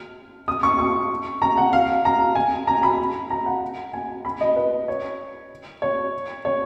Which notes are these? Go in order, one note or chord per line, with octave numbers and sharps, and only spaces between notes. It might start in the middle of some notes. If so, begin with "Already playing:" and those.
Already playing: F6
D#6
C#6
C#6
A#5
F#5
F5
A#5
G#5
A#5
B5
A#5
F#5
G#5
B5
D#5
B4
C#5
C#5
C#5